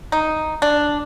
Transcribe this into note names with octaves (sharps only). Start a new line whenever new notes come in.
D#4
D4